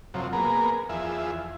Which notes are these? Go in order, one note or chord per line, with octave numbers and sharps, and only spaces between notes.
F#2 C3 F3 F#3
A#3 B3 G#4 A#4
E2 F3 G#4 E5